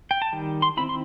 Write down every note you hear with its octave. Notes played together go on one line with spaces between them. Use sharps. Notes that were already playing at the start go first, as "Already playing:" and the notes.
G5
A5
D#3 G3
C6
D#3 A3 C4 E4 B5
C6